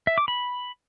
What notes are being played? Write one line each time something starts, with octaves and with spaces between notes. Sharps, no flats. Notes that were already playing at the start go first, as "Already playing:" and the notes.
E5
D6
B5